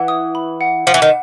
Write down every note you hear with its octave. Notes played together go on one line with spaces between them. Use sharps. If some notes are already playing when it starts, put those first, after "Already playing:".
Already playing: E3 F#5
D#6
B5
F#5
F3 F#5
E3
D#3